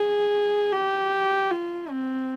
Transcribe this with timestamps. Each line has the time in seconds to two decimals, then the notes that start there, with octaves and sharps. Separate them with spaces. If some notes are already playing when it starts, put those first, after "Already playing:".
Already playing: G#4
0.72 G4
1.51 F4
1.90 C4